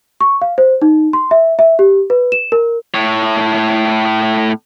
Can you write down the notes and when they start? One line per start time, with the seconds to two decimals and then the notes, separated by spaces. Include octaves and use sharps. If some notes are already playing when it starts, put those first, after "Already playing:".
0.21 C#6
0.42 F5
0.58 C5
0.82 D#4
1.13 C6
1.31 E5
1.59 E5
1.79 G4
2.10 B4
2.32 E7
2.52 A#4
2.94 A2 C#5